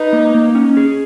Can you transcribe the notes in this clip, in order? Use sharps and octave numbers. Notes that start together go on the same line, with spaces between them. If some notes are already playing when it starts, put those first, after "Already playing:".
Already playing: D#4 B4
A#3
A#3
C#4
G#4